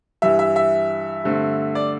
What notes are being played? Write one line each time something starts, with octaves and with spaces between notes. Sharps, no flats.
G2 E3 G3 E5
E5
E5
G2 D3 A3 C4
D5